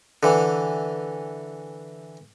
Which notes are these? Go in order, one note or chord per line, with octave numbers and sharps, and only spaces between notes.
D3 E3